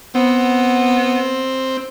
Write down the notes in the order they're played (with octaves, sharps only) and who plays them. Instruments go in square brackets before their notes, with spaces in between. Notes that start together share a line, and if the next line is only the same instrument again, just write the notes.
[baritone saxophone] B3 [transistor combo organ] C4